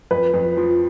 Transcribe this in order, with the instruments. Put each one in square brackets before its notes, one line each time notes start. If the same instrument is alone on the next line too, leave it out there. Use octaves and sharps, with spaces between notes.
[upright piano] F2 [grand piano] B4
[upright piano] F2
F3